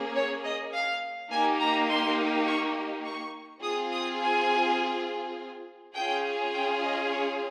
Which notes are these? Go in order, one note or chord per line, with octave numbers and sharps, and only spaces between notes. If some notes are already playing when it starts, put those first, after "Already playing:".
Already playing: A#3 C#4 G#4
C#5
D#5
F5
A#3 D#4 G4 G#5
A#5
C6
C#6
C#6
C4 F4 G#4 D#6
D#6
G#5
C#4 F4 G#4 G5
G5
D#5
C#5